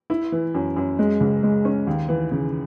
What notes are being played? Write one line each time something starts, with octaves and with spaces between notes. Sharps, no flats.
E4
E3
F#2
F#2
G#3
C#2
G#3
C#4
D#2
E3
C#3